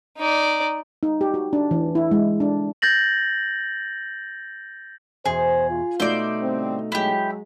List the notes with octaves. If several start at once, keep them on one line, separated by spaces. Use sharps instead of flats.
D#4 D5
D#4
G4
F#4
D4
E3
E4
G#3
D4
G6 A6 A#6 F#7
E2 B2 G#4 C5
F4
B2 A3 D#4 C5 D5
D3 G3 C4
F#3 G#3 E4 G4